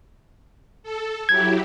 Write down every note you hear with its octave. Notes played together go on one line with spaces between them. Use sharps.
A4
F#3 E4 G4 G#6